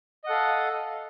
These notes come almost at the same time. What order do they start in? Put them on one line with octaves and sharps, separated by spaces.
D#5 F#5 A4 F5